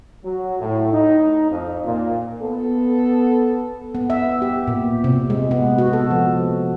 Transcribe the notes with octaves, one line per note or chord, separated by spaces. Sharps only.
F#3
A2
D#4
F2
A#2
B3 A4
B3
E5
G4
A#2
C3
G#3
B3
F#4
A4
F3